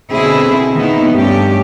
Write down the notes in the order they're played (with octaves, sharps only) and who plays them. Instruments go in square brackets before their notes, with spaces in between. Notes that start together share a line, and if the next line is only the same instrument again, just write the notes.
[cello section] B2 D3 C4 E4 G#4
D#3 A#3 B3 D#4 E4
G2 A3 C#4 G4